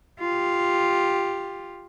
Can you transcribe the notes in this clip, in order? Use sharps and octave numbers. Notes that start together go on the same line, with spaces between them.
F4 G4